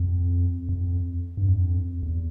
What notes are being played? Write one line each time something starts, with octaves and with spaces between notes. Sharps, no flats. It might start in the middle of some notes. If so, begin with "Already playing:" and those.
Already playing: F2
F2
G2
F2
E2